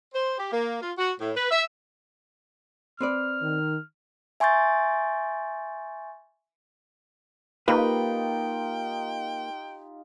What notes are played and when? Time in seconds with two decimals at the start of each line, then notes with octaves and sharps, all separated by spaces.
0.14 C5
0.38 G4
0.52 A#3
0.82 F4
0.98 F#4
1.20 A2
1.36 B4
1.51 E5
3.01 C4 B4 D5 F6
3.42 D#3
4.40 E5 G#5 C6 C#6 G6 A6
7.68 A#3 D#4 F4 G4 B4 G5